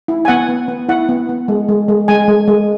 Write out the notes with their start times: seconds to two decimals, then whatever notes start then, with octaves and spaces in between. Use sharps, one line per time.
0.08 E4
0.25 G#5
0.28 B3 F#5
0.48 B3
0.68 B3
0.89 E4 F#5
1.09 B3
1.29 B3
1.48 G#3
1.68 G#3
1.88 G#3
2.08 G#3 G#5
2.28 G#3
2.48 G#3